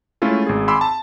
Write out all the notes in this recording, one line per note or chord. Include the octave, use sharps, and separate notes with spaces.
G#3 A3 C#4 E4 F4 A4
G#1 G#4
G#5 B5 C6 D6 E6
A5